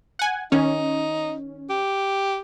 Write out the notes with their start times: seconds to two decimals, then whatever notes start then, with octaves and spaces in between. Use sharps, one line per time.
0.19 F#5 G#5
0.52 D#3 C#4 D#4
1.70 G4